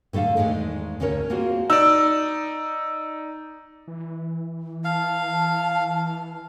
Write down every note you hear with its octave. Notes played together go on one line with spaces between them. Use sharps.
A2 D3 A3 A4 F5
E2 G#2 D#3 G#3 A3
D2 D3 C#4 A#4 C#5
A#3 C4 F4 F#4 G#4
D#4 D5 E6
E3
F5 A5